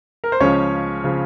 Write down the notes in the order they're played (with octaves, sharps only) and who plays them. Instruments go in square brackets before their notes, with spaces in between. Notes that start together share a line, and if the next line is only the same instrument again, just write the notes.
[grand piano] A#4
C5
C#2 C#3 F3 C#4 C#5
C#3 F3